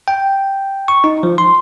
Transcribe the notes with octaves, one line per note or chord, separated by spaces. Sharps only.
G5
C#6
D#4
F3
C6